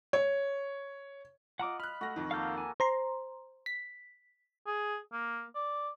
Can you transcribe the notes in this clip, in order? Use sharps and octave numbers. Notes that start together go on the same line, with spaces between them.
C#5
F4 D#5 F#5 A#5 D6
B5 F6 F#6
A3 F#4 A#6
F2 D#3
A#3 A4 F5 F6 G6
G#5
C5 A#5 C6
B6
G#4
A#3
D5